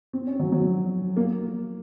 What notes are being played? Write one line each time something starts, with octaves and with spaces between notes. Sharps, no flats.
C4
C#4
F#3
F#3
A#3